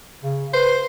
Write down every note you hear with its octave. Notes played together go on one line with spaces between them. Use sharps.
C#3
B4 C5